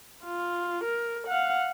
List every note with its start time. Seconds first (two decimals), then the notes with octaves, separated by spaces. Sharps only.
0.24 F4
0.84 A#4
1.28 F5 F#5